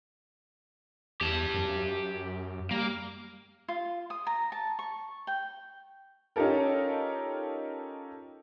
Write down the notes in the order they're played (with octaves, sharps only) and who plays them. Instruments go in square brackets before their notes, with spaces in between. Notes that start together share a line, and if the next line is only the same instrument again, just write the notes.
[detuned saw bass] E2 [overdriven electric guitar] G4 A5
[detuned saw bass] F#2
[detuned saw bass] G3 [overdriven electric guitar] A#3
[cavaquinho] F4
D#6
A#5
A5
C#6
G5
[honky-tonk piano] C#4 D#4 F4 G4 A4 A#4